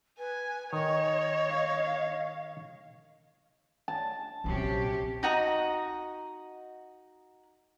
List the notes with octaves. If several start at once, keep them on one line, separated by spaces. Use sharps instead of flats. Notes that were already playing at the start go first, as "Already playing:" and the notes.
B4 G#5
D#3 C#5 D#5
F5
A5
A#1 C3 F#3 C#4 G4
D#4 F#4 D#5 A#5